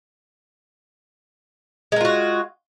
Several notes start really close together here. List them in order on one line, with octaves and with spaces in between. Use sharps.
G#3 A#4 F4 F#4